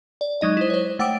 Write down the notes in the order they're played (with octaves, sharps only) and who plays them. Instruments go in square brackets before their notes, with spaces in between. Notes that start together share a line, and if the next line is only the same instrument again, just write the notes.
[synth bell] D5
F#3 G#3 D#4 D#5
E4 C5
C5 C#5
A3 F#5 G5 D6 E6 D7